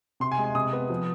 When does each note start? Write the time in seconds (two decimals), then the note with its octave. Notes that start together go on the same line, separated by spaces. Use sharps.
0.20 C3 C6
0.32 G#5
0.38 G#3
0.44 G#5
0.55 C3 D#6
0.73 B3
0.90 F3